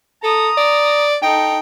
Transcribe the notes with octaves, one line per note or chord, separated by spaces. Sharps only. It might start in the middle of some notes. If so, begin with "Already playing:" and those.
A4 A#5 D#6
D5
D#4 A4 G5